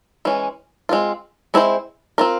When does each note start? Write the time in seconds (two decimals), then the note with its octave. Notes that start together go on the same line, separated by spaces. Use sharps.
0.25 E3 G#3 C#4
0.89 G#3 C4 F4
1.54 G#3 C4 E4 G#4 C5
2.18 C4 F4 A#4